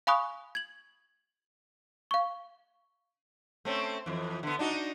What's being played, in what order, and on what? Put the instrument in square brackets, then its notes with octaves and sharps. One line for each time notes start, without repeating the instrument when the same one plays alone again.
[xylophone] F5 G#5 B5 C#6 D#6 F#6
G#6 F#7
F5 C#6
[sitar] A3 C4 C#4
F2 E3
D3 B3
D4 D#4 F#4